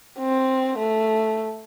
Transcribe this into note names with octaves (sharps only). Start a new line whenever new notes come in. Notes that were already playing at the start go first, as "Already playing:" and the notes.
C4
A3